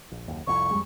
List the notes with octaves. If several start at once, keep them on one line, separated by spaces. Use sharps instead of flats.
A#1
F#1 D#2
C2 F2 C#6
F2 G3 G#3